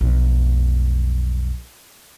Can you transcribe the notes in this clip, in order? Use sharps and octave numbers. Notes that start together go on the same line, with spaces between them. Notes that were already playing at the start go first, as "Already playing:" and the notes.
B1 F2